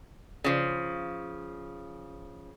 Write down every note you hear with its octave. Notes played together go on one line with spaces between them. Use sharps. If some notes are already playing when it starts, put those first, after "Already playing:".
C#3 F3